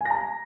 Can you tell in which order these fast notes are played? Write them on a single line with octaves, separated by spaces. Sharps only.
G#5 A#6 A#5